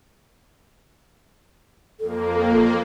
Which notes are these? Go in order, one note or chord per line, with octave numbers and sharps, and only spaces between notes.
F2 A#3 A4